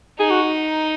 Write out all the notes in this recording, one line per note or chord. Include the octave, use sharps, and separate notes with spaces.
D#4 G#4
F#4